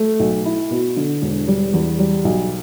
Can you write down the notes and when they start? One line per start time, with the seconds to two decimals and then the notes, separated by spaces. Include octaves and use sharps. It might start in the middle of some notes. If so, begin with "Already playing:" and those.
Already playing: A3
0.20 B1
0.45 E4
0.71 B2
0.96 D3
1.22 E1
1.48 G3
1.73 E2
1.99 G3
2.25 B1